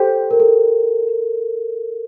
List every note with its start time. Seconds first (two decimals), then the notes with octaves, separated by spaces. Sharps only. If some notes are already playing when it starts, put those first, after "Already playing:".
Already playing: G4 A4 C5
0.31 A#4
0.40 A4